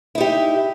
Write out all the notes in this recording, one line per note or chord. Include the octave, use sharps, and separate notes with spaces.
D#4 E4 G4